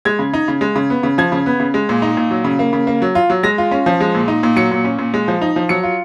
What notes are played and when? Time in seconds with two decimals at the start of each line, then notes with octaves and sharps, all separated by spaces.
0.05 G#3 G#6
0.19 C#3
0.33 D#4
0.48 C#3
0.61 G#3
0.76 C#3
0.90 B3
1.03 C#3
1.18 F3 G#6
1.32 C#3
1.46 B3
1.60 C#3
1.74 G#3
1.89 A#2
2.02 D#4
2.17 A#2
2.31 F#3
2.44 C#3
2.59 A#3
2.73 C#3
2.87 A#3
3.02 F#3
3.15 F4
3.30 F#3
3.43 G#3 A#6
3.58 F4
3.71 C#4
3.86 F3
4.01 G#3
4.15 A#2
4.28 D#4
4.43 A#2
4.56 F#3 C#7
4.71 A#2
4.84 C#4
4.98 A#2
5.14 G#3
5.28 F3
5.42 D#4
5.56 F3
5.69 F#3 C#7
5.83 F4